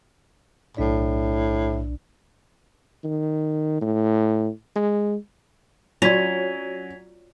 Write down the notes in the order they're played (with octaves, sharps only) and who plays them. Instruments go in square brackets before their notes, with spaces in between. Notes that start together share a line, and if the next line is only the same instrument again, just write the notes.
[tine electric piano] B1 D4 D5 [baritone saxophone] A2
[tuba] D#3
A2
G#3
[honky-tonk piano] F#3 [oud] C#4 [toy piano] F4 F#4 D5 [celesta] G#6 B6 F7